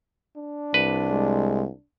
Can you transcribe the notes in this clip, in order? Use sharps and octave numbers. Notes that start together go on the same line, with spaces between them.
D4
C2 B4
G#3